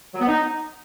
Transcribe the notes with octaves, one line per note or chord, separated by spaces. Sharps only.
F#3
B3
D#4